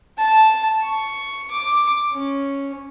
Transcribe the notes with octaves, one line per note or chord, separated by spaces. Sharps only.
A5
C#6
D6
C#4